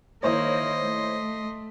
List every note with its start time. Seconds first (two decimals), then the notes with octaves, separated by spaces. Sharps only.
0.23 D#3 A#3 E4 C5 C#5 D#5 C6
0.83 A3